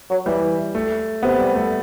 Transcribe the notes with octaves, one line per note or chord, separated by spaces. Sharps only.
F#3
E3 G3
A3
C3 B3
G3
A3